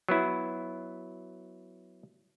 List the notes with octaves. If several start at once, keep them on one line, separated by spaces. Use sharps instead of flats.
F#3 B3 E4